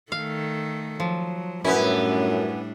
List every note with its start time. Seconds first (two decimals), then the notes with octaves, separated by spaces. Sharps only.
0.12 D#3 A3 A4 F5
1.00 F3 F#3
1.64 F#2 A2 G3 B3 C#4 D4 E4